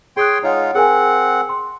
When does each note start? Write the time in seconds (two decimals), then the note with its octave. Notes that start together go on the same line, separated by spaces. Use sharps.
0.17 G#4 C#5 G5 C6 D#6 F#6
0.43 G#3 D#4 F4 C#5 F#5
0.75 C4 G#4 A#4 F#5 G#5
1.49 C6